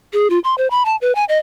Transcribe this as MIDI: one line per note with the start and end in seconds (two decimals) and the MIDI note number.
0.13 0.28 68
0.30 0.39 65
0.44 0.55 84
0.58 0.69 72
0.71 0.83 83
0.86 0.96 81
1.01 1.14 71
1.15 1.24 80
1.29 1.38 75